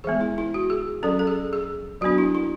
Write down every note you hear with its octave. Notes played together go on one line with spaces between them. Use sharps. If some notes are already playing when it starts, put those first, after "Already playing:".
E3 G#3 B3 G#4
E4
E4
F#4
G#4
F#3 C#4 A4
A4
G#4
G#4
F#3 B3 D4 F#4
E4
E4